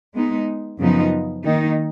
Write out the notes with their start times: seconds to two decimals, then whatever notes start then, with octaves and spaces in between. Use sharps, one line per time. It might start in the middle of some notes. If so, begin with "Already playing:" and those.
0.14 G#3 B3 D#4
0.78 F#2 C#3 F3 B3 D#4
1.44 D#3 A#3 D#4